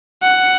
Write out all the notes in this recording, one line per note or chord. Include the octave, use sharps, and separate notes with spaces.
F#5